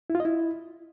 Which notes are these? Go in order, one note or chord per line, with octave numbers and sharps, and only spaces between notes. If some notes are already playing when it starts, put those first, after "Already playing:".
E4
F4
D#5
E4